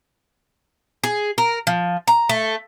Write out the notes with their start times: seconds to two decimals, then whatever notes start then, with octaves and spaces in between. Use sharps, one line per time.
1.04 G#4
1.38 A#4
1.67 F3
2.07 A#5
2.29 A3